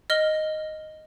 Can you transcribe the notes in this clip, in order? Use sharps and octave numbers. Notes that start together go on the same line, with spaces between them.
D#5 F6 G7